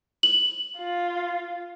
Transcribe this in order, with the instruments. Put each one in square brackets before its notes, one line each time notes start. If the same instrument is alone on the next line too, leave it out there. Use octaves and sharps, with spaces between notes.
[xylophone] F#7
[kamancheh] F4